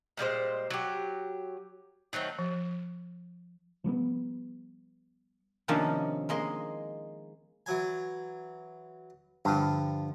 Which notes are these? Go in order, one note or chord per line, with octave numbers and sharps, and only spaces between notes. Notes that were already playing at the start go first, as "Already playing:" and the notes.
A#2 G3 G#3 C5
F#3 G4
D#3 F#3 A3 C4
F3
F3 G3 A3 B3
C3 D#3 F3 A#3 C#4 D4
G#3 A#3 D#5 C6
E3 F#3 G#5
G2 D3 F3